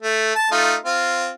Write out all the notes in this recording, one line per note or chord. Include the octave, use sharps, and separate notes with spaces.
A3
A5
A3 D#4 F4
C4 F4